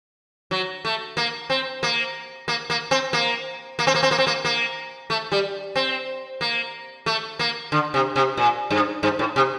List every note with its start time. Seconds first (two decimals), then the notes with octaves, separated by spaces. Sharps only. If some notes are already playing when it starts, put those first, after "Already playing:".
0.51 F#3
0.85 A3
1.17 A#3
1.50 C4
1.83 A#3
2.48 A#3
2.70 A#3
2.91 C4
3.13 A#3
3.79 A#3
3.87 C4
3.95 A#3
4.03 C4
4.11 A#3
4.18 C4
4.27 A#3
4.45 A#3
5.10 A3
5.32 G3
5.76 C4
6.41 A#3
7.06 A3
7.39 A#3
7.72 D3
7.94 C3
8.16 C3
8.37 A#2
8.71 G2
9.03 G2
9.19 A2
9.36 C3